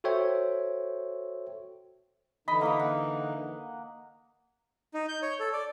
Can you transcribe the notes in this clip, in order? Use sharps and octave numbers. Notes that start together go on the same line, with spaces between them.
F#4 A4 C5 C#5 E5 G5
D3 E3 D#4 D#5 B5
A#3 A#4 D#6
F#5
D#4
G6
C#5
A4
D5